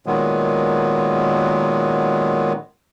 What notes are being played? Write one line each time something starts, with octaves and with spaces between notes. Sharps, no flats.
A#2 D#3 F#3 G#3 B3